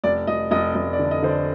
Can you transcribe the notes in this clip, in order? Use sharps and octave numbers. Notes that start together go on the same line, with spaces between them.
F1 D5
F1 D#5
F1 D#5
F1 D#5
D5
D3
D#5
D3 C5
D5